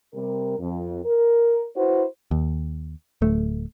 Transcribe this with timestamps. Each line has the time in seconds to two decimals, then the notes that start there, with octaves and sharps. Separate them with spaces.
0.14 C3 G3 A#4
0.59 F2
1.05 A#4
1.76 E4 F#4 B4 C5
2.31 D#2
3.22 D1 A3